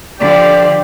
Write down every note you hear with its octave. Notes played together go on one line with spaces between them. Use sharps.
D3 F3 G4 D5